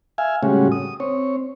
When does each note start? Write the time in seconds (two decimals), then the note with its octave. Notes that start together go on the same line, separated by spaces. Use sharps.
0.18 E5 F5 G#5
0.43 A2 C#3 G3 G#3 C#4 F#4
0.72 D#6
1.00 C4 C#5